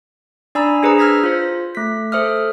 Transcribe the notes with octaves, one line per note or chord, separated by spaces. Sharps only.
D4 D5 G#5 A#5 B5 E6
D4 G#4 B4 C5 A#5
E6 F6 G#6 A#6 B6
F4 C5
A3 B6
A4 C5 E5 D#6 F6